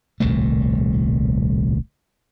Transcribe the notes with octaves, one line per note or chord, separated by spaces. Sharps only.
D#1 C2 A2 A3